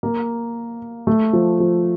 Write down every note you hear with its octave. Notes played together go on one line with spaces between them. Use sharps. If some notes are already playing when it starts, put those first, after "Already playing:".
A#3
A3
F3
F3